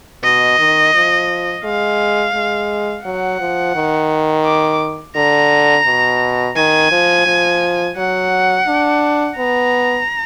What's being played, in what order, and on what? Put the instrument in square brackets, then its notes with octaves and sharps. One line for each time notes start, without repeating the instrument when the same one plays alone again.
[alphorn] B2 [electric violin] D#5
[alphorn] D#3
F3
[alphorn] G#3 [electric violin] F5
[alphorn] G#3
[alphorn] F#3 [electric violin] F#5
[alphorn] F3
D#3
[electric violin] D6
[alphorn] D3 [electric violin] A#5
[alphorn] B2
[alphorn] D#3 [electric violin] G#5
[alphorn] F3
F3
[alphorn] F#3 [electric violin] F#5
[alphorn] D4
[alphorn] B3 [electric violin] A#5